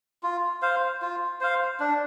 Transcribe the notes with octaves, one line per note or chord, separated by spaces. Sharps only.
F4
C5 F5
F4
C5 F5
D4